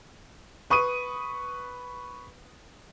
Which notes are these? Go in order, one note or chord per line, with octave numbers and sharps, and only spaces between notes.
B4 C#6 D#6 D#7